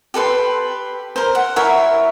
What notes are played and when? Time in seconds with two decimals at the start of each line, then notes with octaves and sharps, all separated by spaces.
0.14 G4 A4 B4 C6
1.16 A#4 C5
1.35 F#5
1.56 E4 A#4 C#5 E5